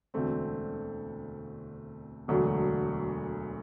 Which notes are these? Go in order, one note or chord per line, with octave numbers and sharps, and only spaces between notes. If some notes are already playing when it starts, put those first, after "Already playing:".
E1 D2 D3 A3 C4
E1 D2 D3 F#3 A3